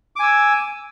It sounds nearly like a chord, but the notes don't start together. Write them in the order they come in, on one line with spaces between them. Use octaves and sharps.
D6 G#5 E6